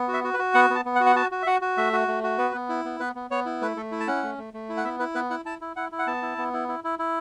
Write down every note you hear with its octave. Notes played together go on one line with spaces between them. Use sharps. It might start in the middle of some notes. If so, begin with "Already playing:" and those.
Already playing: B3
F#4
E5
F#4
B4
F#4
B3 F#5
B3
A5
B3
F#5
F#4
F#5
F#4 A5
F#4
E5
F#4 F#5
F#4
A3 E5
F#4
A3
F#4
B3 B4
B3
E4
B3
B3 B4
B3
B3 C#5
E4
A3 B4
A3 A4
E4
A5
C#4 F#5
A3
A3
A3
E4
F#5
B3 E5
E4 B4
B3 B4
E4 F#5
E4 A5
E4
E4 F#5
E4
F#5
B3 A5
E4
B3
E4
E4
E4
E4